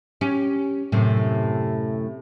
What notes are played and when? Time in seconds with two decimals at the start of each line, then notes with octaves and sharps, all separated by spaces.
0.21 C#4 G4
0.92 F#2 A2 C3